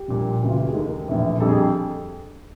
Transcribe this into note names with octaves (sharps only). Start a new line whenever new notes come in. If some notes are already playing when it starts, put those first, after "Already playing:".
Already playing: G4
A#1 A#2 G3
C#2 C#3 E3 A3 F#4
F4
G4
G#4
D#2 D#3 G#3 A4
A#1 A2 E3
F2 D3 G3 A4
G#4
A4